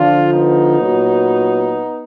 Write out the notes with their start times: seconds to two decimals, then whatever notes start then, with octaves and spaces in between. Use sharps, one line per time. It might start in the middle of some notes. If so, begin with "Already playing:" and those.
Already playing: D3 F3 D4 F4
0.32 B3 D#4
0.80 A#2 F#3